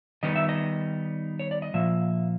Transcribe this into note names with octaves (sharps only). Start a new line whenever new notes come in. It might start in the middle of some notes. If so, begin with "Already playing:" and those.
D#3 G3 B3 D#4 D#5
E5
D#5
C#5
D5
D#5
A#2 F3 A#3 E5